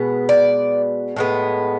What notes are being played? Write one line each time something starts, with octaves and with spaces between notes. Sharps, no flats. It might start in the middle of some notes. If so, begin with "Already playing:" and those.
Already playing: B2 G#3 B3
D5
A2 G#3 B3